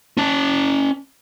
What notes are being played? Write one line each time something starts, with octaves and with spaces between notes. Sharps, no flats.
C#4 A5